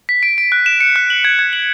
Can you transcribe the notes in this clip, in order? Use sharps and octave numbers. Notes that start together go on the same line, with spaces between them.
B6
D7
D7
F#6
E7
C#7
F#6
F#7
G#6
G#6
F#7